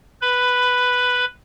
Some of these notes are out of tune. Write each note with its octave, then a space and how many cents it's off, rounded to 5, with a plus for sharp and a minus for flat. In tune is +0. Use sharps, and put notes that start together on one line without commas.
B4 +0 B5 +10